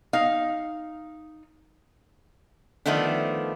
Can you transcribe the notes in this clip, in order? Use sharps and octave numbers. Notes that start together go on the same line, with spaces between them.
D#4 F5
D#3 F3 A3 B3 D4